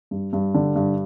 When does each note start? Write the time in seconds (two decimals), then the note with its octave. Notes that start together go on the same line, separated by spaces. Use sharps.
0.11 G2
0.33 G2
0.54 D3
0.76 G2